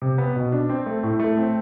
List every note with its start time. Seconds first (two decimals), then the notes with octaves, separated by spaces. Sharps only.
0.02 C3
0.18 B3
0.36 B2
0.52 D4
0.69 C4
0.86 A3
1.03 A2
1.19 A3
1.37 C4